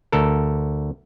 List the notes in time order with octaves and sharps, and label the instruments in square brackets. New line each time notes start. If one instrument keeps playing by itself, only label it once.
[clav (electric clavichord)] D2 A4 A#4